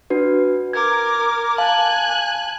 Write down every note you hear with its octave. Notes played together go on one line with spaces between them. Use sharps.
D4 F#4 B4
A#4 D6 G#6
F5 G#5 A5 F#6